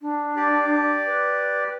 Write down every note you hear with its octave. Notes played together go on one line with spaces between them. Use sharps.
D4
G4 D5
B4